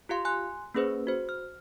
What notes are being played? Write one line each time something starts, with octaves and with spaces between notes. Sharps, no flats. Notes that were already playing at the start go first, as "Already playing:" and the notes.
F4 G4 F5 C6
G#5 C6 F#6
A#3 C#4 G#4 B4 C5
F#4 C5
F6